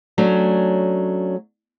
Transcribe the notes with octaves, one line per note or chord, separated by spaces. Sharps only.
F#3 A3 C#4 D4